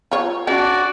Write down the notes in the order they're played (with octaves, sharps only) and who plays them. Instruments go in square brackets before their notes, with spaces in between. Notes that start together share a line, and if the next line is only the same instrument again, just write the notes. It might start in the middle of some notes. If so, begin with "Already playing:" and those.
[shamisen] F4 C#5
[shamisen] C#4 D4 [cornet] F#4 [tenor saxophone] D5